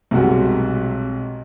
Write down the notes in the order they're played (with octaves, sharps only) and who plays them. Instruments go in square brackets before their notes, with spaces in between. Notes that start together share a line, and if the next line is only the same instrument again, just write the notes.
[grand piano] B1 G#3 A#4 [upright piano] C3 G3 F#4